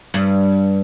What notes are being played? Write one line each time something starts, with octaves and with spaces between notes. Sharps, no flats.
G2